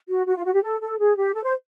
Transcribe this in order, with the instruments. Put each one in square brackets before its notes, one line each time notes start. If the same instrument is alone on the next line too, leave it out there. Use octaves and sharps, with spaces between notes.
[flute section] F#4
F#4
F4
F#4
G4
A4
A4
G#4
G4
A4
C5